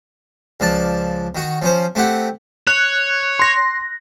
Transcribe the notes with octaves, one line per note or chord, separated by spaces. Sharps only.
C#2 F3 D5 A5
D#3 F#4
F3 C#4 C5
A3 C4 G4 F#5
C#5 F#6
C6 A#6